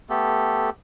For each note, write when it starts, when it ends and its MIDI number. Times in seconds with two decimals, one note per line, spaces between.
0.10 0.70 57
0.10 0.70 59
0.10 0.70 67
0.10 0.70 69